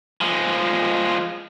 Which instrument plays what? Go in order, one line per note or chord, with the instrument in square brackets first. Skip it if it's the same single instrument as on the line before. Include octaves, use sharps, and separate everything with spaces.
[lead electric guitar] F3 G#3